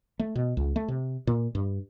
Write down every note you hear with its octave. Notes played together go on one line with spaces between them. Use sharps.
A3
B2
C#2
A3
C3
A#2
G2